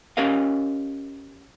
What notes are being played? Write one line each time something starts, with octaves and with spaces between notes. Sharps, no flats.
C#4 G4 A#4 D#5 F5